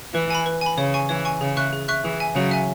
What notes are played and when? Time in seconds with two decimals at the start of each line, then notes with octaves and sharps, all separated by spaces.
0.14 E3 B4
0.30 G#5 B5
0.46 B4
0.61 G#5 B5
0.77 C#3 C#5
0.94 G#5 C#6
1.09 E3 C#5
1.25 G#5 C#6
1.41 C#3 G#4
1.57 E5 C#6 F#6
1.73 G#4
1.88 E5 C#6 F#6
2.04 E3 G#4
2.20 E5 G#5
2.35 C#3 F#3 G#4
2.51 E5 G#5